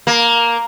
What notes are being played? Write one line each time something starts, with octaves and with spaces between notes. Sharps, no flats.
A#3